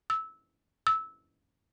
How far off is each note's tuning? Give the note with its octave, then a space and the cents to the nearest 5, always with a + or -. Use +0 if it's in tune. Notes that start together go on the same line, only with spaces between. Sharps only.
E6 -15
E6 -15